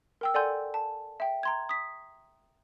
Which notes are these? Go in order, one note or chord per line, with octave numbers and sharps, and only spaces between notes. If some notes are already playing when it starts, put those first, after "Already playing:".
A#4 G5 E6
A4 D5 F#5 G#5 C6 G6
A5
E5 G5
A#5 C6 G#6
D#6 B6